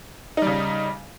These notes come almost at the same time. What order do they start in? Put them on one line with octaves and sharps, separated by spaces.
D#4 G3 C#3